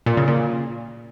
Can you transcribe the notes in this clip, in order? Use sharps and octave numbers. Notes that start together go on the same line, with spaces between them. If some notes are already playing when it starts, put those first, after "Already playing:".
A#2
C#3
A#2